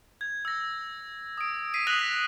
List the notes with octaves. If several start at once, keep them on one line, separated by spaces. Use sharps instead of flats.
G#6
E6 A#6
D#6 D7
B6 C7 D#7
D#6 F#6 A#6 B6 F7 F#7
B6